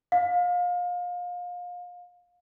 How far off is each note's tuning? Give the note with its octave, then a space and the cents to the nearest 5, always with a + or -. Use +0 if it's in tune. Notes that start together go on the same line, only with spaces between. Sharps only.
F5 +30